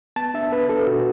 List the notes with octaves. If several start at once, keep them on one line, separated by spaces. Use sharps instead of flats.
B3 A5
D4 E5
B3 B4
D4 A4
B2 F#4